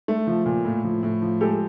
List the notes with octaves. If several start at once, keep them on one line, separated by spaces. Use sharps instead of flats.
A3
F3
A#2
A2
F3
A2
F3
G#3 G4 A4